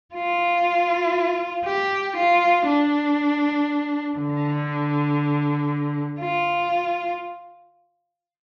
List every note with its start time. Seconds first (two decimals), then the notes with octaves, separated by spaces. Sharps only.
0.15 F4
1.65 G4
2.16 F4
2.67 D4
4.18 D3
6.20 F4